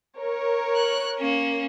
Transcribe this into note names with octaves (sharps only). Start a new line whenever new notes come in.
A#4 C#5
F#6
A#3 C#4